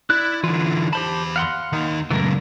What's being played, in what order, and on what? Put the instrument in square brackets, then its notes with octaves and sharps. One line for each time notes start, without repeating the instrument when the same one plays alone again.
[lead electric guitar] E4 [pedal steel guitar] D5 F#6
[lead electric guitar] D3 E3 [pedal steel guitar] E4 F4
[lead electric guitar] E2 B5 [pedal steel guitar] G4 C5 A5
[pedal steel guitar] F5 F#5 C6
[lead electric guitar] D#2 D#4
[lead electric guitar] C#2 F#2 [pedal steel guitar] E3 A3 A#4